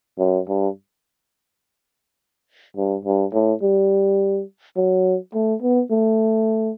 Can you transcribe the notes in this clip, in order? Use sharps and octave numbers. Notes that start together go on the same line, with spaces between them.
F#2
G2
G2
G2
A2
G3
F#3
A3
B3
A3